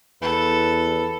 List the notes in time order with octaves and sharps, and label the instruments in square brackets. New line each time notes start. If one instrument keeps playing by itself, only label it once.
[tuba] E2 [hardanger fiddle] A4 [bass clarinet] B4